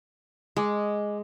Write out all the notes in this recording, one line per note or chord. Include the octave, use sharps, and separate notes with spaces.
G#3 D#5 G#5 D6